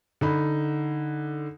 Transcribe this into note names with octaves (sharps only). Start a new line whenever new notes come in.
D3 D#4 B5